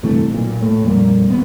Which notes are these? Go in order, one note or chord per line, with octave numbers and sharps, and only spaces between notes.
G2 C3 E3 A3
B1 A#2
A2 A3
F2 A#2 G3 A#3
G#1 B3